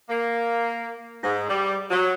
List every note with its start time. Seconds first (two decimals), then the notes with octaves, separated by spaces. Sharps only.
0.09 A#3
1.23 G#2
1.48 G3
1.90 F#3